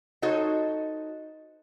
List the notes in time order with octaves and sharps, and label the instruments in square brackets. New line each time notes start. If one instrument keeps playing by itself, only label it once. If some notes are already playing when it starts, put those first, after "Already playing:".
[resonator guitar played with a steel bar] D#4 F#4 A4 C5 C#5 D#5